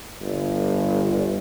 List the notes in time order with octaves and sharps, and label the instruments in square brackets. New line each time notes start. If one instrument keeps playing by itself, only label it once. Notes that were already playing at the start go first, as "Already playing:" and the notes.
[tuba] G1